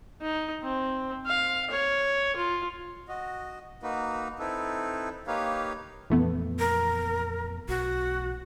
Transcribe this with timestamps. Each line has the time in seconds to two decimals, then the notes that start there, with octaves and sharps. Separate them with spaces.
0.21 D#4
0.63 C4
1.26 F5
1.71 C#5
2.36 F4
3.08 F#4 D#5
3.83 A#3 D#4 F#4 B4
4.39 C4 D#4 E4 A4 B4
5.27 A#3 D#4 G4 B4 C#5 F5
6.10 F2 A#2 E3 A3 B3
6.59 A#4
7.69 B1 F#4